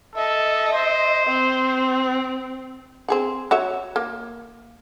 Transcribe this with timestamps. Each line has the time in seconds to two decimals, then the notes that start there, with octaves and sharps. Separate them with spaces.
0.15 A4 D#5 E5
0.73 C5
1.27 C4
3.08 C4 G#4 F#5
3.51 F#4 C#5 E5
3.96 A#3